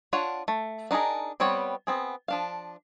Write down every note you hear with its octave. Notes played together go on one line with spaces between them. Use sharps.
D4 F4 C#5 F#5
A3
D4 D#4 F4 G#4 A#4
G3 B3 C4 C#5
B3 C4 G#4
F3 D4 F5